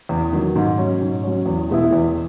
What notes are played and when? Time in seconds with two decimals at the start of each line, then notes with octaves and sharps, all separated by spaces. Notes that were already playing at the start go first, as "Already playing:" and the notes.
0.09 E2
0.33 D#3 F#3
0.56 G#2
0.78 F#3 C#4
1.01 G#2
1.23 F#3 C#4
1.46 E2
1.70 B2 G#3 B3 E4
1.93 E2